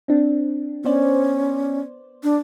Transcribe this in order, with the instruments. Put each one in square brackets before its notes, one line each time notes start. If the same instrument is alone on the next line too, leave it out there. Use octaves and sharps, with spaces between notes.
[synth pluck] C4 D4
[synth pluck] B3 C5 D5 [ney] C#4
[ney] D4